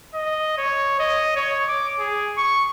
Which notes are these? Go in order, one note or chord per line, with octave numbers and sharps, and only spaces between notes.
D#5
C#5
D#5
C#5
D6
G#4
C#6